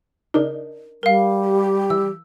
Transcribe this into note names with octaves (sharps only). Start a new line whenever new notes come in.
C#3 D4 D#4 A#4
G3 A#4 F5
G4
E3 E6